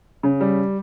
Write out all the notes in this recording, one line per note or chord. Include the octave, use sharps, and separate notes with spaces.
C#3
G3